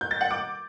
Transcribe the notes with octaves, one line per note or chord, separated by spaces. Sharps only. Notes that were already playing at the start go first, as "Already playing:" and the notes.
G6
A6
F#5
D6